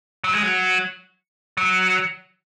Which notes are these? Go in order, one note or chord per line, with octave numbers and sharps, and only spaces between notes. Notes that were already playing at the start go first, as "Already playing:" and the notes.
F#3
G#3
F#3
F#3